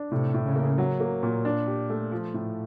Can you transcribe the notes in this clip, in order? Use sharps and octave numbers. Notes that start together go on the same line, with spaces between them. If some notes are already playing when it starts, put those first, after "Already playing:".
Already playing: D4
A2 C3
A2
C#3
A#3
F#3
A#3
A#2
D4
G4
A3
F3
A2